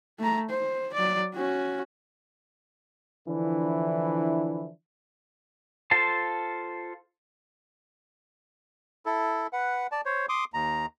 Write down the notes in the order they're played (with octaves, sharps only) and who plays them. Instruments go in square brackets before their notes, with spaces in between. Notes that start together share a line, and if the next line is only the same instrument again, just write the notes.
[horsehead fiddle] A3 A#5
C5
F#3 D5
C#4 F#4
[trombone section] D3 E3 F3 D4 E4
[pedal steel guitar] F4 A4 C5 A5
[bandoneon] E4 A4
B4 F#5
D5 A5
C5 C#5
C6 D6 D#6
D#2 A#5